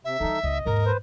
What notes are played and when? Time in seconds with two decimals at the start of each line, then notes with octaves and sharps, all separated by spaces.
0.05 C3 E5
0.20 E3 G3 D#4 A4
0.43 C#2 D#5
0.65 D#2 G#2 A#4
0.86 B4 C5